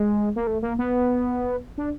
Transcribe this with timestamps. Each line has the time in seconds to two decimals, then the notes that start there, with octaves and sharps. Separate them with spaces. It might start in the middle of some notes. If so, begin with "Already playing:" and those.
Already playing: G#3
0.36 A#3
0.47 A3
0.62 A#3
0.79 B3
1.78 D4